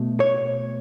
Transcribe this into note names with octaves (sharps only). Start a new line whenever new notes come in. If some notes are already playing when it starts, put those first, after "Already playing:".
Already playing: B2 A3
C#5